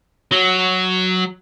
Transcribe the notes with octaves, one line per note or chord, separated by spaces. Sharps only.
F#3